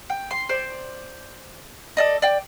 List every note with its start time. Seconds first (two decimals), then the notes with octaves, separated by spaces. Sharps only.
0.10 G5
0.31 C6
0.49 C5 D5
1.97 A4 D5 D#5
2.22 D5 G5